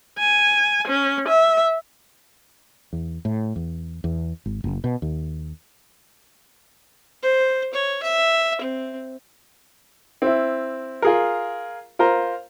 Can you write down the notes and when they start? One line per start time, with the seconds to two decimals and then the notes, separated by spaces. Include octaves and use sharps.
0.19 G#5
0.88 C#4
1.28 E5
2.93 E2
3.25 A2
3.56 E2
4.04 E2
4.46 G#1
4.64 F#1
4.84 B2
5.02 D#2
7.23 C5
7.74 C#5
8.03 E5
8.61 C4
10.22 C4 E4
11.02 F4 G#4 A#4
11.99 F4 A#4 C5 A#5